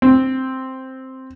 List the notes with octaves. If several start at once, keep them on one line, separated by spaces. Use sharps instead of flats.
C4